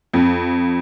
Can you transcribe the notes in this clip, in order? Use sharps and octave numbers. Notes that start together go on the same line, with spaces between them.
F2